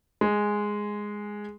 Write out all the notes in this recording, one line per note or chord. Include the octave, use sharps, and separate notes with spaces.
G#3